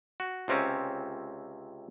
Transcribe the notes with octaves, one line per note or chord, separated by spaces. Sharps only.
F#4
C#2 C3 C4 C#4